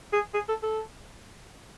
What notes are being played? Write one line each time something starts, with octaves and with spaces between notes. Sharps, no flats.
G#4
G#4
A4
A4